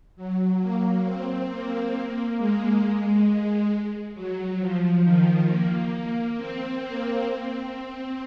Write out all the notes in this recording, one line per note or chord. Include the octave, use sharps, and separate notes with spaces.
F#3
A#3
C4
A#3
G#3
F#3
F3
D#3
A#3
C4
A#3
C4